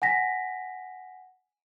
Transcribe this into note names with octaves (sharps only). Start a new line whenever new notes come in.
F#5 G#5 A#6 B6